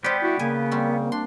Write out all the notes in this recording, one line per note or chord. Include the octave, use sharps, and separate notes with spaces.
G3 B3 G4 C5 D5
E4 F#4
C#3 A#3 G#5
G3 C4 F#4
D4 C6